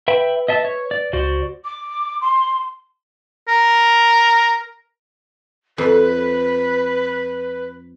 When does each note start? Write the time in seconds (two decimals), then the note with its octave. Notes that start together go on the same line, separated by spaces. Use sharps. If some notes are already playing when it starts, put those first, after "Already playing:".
0.08 B4 E5 G5 B5
0.48 D#5 E5 A5
0.65 C#5
0.91 D5
1.13 C#2 F#4 C5 D5
1.64 D6
2.21 C6
3.48 A#4
5.78 F2 B4